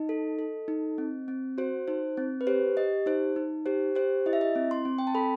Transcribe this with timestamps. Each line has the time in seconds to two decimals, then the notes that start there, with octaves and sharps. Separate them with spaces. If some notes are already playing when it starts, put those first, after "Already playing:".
Already playing: D#4 D#5
0.09 A4
0.39 A4
0.68 D#4
0.98 C4
1.28 C4
1.58 F#4 C5
1.88 D#4 C5
2.17 C4
2.41 B4
2.47 G4 C5
2.77 G4 D#5
3.06 D#4 C5
3.36 D#4
3.66 G4 C5
3.95 G4 C5
4.26 E4 D#5
4.33 E5
4.41 D#5
4.55 C4
4.71 C6
4.85 C4
4.98 G5
5.07 A5
5.15 A4 B5